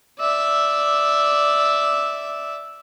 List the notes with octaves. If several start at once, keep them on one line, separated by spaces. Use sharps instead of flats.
D5 E5